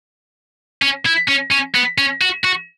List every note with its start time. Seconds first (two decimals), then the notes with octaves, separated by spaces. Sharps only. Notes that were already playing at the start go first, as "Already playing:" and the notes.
0.82 C#4
1.06 E4
1.29 C#4
1.52 C#4
1.75 B3
1.98 C#4
2.22 F#4
2.45 F#4